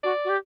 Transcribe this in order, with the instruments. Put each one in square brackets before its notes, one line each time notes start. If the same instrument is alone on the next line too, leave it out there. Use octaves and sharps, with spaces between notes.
[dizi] F#4 [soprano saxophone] D5
[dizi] F#4
G4